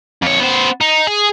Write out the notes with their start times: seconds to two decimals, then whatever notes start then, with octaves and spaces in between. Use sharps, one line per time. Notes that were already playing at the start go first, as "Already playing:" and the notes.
0.22 F2 C#5
0.40 B3 C5
0.81 D#4
1.07 G#4